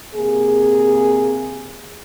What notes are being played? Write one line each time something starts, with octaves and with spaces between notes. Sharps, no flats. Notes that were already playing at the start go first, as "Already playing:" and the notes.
C3 A#3 G#4